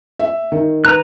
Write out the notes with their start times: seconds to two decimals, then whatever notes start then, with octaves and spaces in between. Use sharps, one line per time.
0.19 E5
0.52 D#3
0.85 B4 A#5 F#6